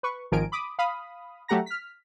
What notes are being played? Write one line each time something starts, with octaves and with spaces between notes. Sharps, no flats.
B4 C#6
G#1 D#3 F3 A#4 G#5 D7
B5 D6 D#6
F5 B5 D#6
F#3 A3 G4 F#5 A#5 A#6
F6 B6